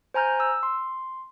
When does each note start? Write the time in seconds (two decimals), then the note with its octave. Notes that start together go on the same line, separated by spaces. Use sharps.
0.14 C5 G#5 A#5 F6 G6
0.40 E6
0.63 C6